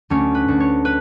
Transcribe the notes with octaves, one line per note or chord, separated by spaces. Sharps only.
D2 C#4
B4
D2
C#5
B4